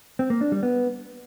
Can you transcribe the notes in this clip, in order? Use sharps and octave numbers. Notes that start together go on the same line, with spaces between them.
C4
A#3
D4
G3
B3